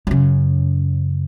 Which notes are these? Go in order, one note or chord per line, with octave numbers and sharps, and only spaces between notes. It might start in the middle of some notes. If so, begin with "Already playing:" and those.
F#2 C#3